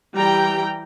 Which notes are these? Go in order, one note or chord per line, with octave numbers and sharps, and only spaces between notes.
E3 G3 G5 A#5